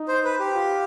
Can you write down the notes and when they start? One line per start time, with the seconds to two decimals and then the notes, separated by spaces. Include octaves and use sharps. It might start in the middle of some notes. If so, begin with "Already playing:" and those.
Already playing: D#4
0.08 C5
0.25 B4
0.39 G4
0.55 F4